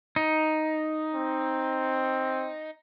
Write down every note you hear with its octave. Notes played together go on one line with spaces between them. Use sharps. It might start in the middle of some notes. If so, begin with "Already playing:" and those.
D#4
C4